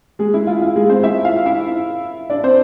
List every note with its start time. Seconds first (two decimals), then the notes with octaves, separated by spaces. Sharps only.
0.19 G#3 G#4
0.34 E4
0.47 F4
0.62 F4
0.76 G#3 G#4
0.89 C4 C5
1.03 E4 E5
1.24 F4 F5
1.46 E4 E5
2.30 D4 D5
2.43 C4 C5